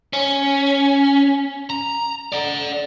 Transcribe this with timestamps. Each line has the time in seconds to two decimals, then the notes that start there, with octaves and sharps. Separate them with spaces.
0.13 C#4
1.70 A#5
2.32 D5 F#5